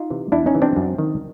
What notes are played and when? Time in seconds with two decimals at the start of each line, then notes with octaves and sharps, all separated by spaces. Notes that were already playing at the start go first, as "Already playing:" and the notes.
Already playing: D#4 F4
0.10 C3 E3
0.32 E2 D4 E4
0.46 C#4 D#4
0.55 C3 E3
0.62 C4 D4
0.77 F#2
0.98 D#3